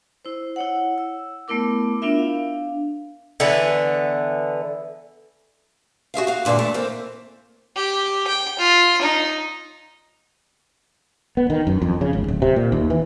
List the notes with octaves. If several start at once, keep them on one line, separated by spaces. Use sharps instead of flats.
E4 C5
E4 C#5 F#5
E6
A3 B3 E4 A#4 D6
B3 D4 E4 F4 A#4 E5
D4 F5
D3 E3 B3
F#4 G#4 E5 F5
F#4 F5
G2 A#2 D3 E3 G#3
A3
E3 A#3 C4
G4
G5
F4
D#4
B3
D#3
F#2
F2
C#3
G#1
D1
C3
A#2
D#2
E3